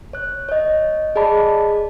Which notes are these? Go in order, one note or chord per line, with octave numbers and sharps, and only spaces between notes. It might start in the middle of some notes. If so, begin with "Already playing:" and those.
C#5 F#6
C#5 D#5
G#4 D5 D#5 A5 B5